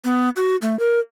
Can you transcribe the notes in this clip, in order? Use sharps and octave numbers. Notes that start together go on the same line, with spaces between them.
B3
F#4
A3
A#4